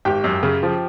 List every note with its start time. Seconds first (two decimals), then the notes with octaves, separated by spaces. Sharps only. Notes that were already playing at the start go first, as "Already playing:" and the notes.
0.05 G#1 G4 G5
0.24 F#2
0.43 C#3
0.63 F3